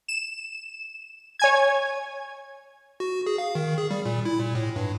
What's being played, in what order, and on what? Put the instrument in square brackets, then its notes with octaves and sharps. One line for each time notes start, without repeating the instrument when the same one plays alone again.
[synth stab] E7
C#5 G#5 G#6
[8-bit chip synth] F#4
G#4
F5
D#3
G#4
G3
A#2
E4
A#2
A2
G2